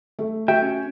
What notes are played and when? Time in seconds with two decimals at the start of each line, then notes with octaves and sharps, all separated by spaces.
0.19 A3
0.48 F#4 E5 G5
0.62 C#4